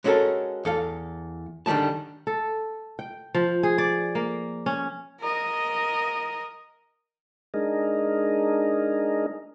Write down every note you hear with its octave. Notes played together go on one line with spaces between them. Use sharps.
G#3 C#4 F#4 G4 A4 A#4
E2 A4 F5
D3 D#3 G3 G#3 A5
A4
G5
F3
G#4
D5
A#3
C#4
A#4 D#5
G#3 D4 D#4 G#4 A#4 D#5